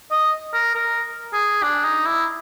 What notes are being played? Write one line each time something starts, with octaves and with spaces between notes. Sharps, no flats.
D#5
A#4
A#4
G#4
D4
D#4
E4